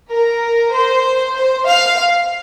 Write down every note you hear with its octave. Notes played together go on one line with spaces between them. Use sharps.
A#4
C5
C5
F5